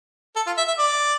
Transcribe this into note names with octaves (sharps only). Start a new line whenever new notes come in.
A4
F4
E5
E5
D5